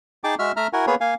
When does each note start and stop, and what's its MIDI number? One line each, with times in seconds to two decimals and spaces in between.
0.24 0.35 63
0.24 0.35 68
0.24 0.35 79
0.24 0.35 81
0.24 0.35 86
0.39 0.52 56
0.39 0.52 66
0.39 0.52 76
0.39 0.52 88
0.39 0.52 89
0.57 0.67 57
0.57 0.67 76
0.57 0.67 82
0.57 0.67 89
0.73 0.86 64
0.73 0.86 66
0.73 0.86 70
0.73 0.86 78
0.73 0.86 80
0.87 0.95 58
0.87 0.95 59
0.87 0.95 68
0.87 0.95 71
0.87 0.95 73
1.01 1.14 58
1.01 1.14 77
1.01 1.14 80